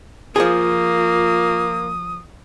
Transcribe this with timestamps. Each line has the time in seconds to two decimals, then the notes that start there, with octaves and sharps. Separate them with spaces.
0.36 F3 A#3 F4 G#4 D#6